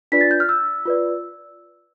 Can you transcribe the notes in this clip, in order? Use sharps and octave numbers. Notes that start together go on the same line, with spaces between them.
D4 F4 B4 D5 B6
A6
G6
F6
E6
F4 B4 D5